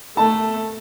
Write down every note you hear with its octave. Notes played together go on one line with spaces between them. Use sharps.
A3 A5